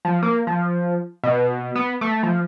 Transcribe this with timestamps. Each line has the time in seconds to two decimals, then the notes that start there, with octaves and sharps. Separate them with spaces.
0.05 F3
0.23 A#3
0.47 F3
1.24 B2
1.75 B3
2.01 A3
2.23 F3